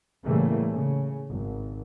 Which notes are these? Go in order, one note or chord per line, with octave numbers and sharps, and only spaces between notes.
A2 C#3 E3 G3 A3 A#3
C#3
G#1